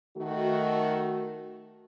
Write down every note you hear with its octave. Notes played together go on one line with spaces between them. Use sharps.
D#3 A3 F#4